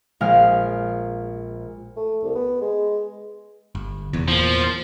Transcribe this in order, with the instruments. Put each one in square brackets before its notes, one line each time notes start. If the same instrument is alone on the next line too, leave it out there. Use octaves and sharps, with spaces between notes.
[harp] A#1 G#3 F5 F6
[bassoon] A3
C2
B3
G#3
[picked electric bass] G1
F1 E2
[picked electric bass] E2 A#2 [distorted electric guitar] F3